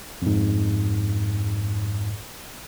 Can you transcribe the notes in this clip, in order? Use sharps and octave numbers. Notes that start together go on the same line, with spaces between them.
F2 G#2